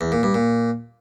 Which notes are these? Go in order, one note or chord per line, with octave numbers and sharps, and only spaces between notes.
E2
A#2
G2
A#2